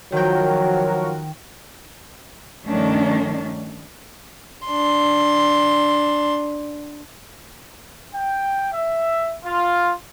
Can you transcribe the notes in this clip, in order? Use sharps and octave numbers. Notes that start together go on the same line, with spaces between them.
D#3 F3 F#3 F#4 A#4 G5
G2 D#3 F3 A3 C#4 D4
D4 C6
G5
E5
F4